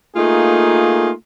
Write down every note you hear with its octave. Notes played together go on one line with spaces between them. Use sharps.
A3 A#3 D#4 F4 G#4